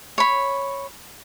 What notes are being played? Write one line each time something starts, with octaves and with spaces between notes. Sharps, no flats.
C#5 B5